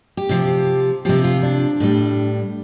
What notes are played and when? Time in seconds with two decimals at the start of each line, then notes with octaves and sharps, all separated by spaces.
0.17 G4
0.29 C3 F3
1.05 C3 F3 G4
1.24 F4
1.42 D4
1.80 A2 G3